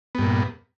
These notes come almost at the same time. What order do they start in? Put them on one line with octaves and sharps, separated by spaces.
B3 G2 A#2